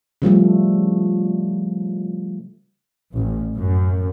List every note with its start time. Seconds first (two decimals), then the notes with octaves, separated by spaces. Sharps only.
0.22 C#3 F3 G3 A3
3.15 A1
3.54 F#2